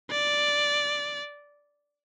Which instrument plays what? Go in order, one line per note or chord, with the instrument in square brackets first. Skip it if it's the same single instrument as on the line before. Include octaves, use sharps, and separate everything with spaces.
[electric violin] D5